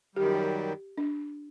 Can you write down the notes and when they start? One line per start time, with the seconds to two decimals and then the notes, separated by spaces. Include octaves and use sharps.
0.15 F#2 D#3 G3 G4
0.98 D4